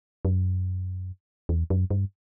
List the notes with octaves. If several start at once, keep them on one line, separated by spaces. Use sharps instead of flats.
F#2
E2
F#2
G2